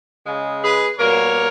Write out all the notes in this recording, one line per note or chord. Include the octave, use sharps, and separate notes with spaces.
C#3 G#3
G#4 B4
B2 G3 A#3 A#4 C#5